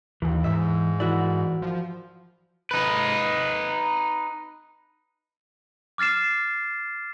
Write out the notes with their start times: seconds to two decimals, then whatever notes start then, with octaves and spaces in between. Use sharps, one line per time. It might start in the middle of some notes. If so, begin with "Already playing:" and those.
0.22 D#2 E3
0.44 G#2 E5
1.00 E3 E4 F#4 A#4 D5
1.62 F3
2.71 D#4 B4
5.98 D6 F6 A6 C7 E7